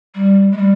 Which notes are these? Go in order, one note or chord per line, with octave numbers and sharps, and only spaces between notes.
G3
G#3
G3